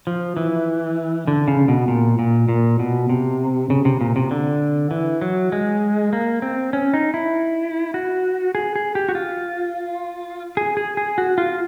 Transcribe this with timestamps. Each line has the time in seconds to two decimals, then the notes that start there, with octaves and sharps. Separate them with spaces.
0.07 F3
0.37 E3
1.27 D3
1.48 C#3
1.68 B2
1.88 A#2
2.19 A#2
2.49 A#2
2.79 B2
3.09 C3
3.70 C#3
3.85 C3
4.01 A#2
4.16 C3
4.31 D3
4.91 E3
5.22 F#3
5.52 G#3
6.13 A#3
6.42 C4
6.73 C#4
6.94 D#4
7.14 E4
7.94 F#4
8.55 G#4
8.76 G#4
8.95 G4
9.09 F#4
9.15 F4
10.57 G#4
10.77 G#4
10.97 G#4
11.18 F#4
11.38 F4